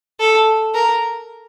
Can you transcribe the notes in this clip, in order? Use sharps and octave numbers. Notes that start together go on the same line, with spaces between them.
A4
A#4